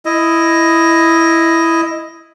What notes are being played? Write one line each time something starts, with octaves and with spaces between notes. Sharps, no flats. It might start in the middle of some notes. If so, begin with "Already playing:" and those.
E4 D#5